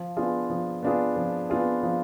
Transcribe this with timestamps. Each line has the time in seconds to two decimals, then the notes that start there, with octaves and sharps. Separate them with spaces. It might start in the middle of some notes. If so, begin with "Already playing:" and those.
Already playing: F3
0.17 B3 D4 F4 G#4
0.50 F3
0.83 B3 D4 F4 G#4
1.16 F3
1.50 B3 D4 F4 G#4
1.83 F3